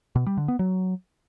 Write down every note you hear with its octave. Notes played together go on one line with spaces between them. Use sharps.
B2
G3
D3
B3
F#3